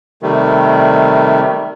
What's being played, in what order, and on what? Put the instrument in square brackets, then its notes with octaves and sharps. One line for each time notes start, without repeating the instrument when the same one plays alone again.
[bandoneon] C3 D#3 G3 A3